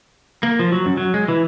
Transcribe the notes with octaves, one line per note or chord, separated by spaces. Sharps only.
A#3
F3
F#3
F#2
F#3
G#3
E3